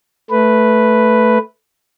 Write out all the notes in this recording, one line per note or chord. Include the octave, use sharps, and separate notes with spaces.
A3 B4